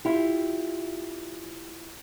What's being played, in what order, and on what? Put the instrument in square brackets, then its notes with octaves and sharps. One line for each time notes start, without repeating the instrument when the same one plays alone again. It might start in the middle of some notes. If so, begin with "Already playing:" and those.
[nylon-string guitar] E4 F4 G4